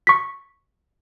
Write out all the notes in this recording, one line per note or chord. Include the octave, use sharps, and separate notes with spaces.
C#6 B6